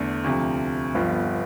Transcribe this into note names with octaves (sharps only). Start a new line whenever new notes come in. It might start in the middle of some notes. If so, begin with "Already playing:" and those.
Already playing: E2 D3 A3
D2 C3 F3
G1 G2 F3 B3 F4